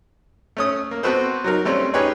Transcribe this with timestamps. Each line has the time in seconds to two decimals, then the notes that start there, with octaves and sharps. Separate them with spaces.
0.57 A3 C#4 D#6
0.91 A#3
1.03 B3 C4 F#4 A4 B4 C5
1.44 F#3 D#4 A#4
1.65 G3 A3 C4 C#4
1.94 C#4 D#4 G4 G#4 B4 C#5